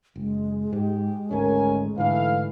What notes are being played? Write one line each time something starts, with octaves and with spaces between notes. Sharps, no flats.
F#1 G#3
G#2 G4
G#1 D2 A3 C#4 A#4 G#5
G#2 D3 E3 A3 D4 F5